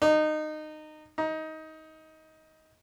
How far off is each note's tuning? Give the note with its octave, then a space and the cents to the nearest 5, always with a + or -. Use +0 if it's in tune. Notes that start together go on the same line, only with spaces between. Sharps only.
D#4 -20
D#4 +20